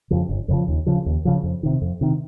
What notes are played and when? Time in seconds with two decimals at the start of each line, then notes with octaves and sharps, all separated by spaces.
0.11 F2 C#3 F3
0.29 G1
0.48 F2 C#3 F3
0.68 D#2
0.86 C#3 F3
1.06 D#2
1.25 C#3 F3
1.43 F2
1.63 C3 D#3
1.82 F2
2.01 C3 D#3